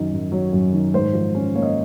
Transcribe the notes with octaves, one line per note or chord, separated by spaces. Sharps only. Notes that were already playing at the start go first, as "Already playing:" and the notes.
Already playing: F#2 D#3 D#5
F#2
F#3 C#5
F#2
D#3
G#2 C5
F3
C#4
A#3 C#5
D#5